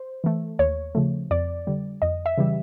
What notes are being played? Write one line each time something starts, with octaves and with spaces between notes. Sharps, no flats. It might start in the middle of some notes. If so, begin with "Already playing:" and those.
Already playing: C5
E3 A3
D#2 C#5
C#3 F3 A3
F2 D5
D3 G3
F2 D#5
E5
C#3 E3 G3